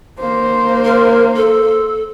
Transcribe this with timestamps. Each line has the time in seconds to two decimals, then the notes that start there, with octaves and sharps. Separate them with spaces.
0.20 A#3 C5
0.85 A#4
1.36 A4